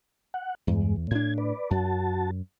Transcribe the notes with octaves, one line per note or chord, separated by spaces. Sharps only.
F#5
E2 G2 G#3
A2 D4 G#6
B4 D5
F#2 F#4 A5